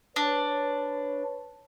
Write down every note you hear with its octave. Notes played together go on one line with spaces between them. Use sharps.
D4 B4 C#5